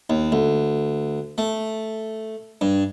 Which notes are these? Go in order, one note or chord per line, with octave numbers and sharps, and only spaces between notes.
D#2
D2
A3
G2